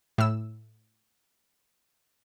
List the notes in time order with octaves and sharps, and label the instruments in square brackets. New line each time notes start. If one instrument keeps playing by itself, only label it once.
[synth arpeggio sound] A2 E6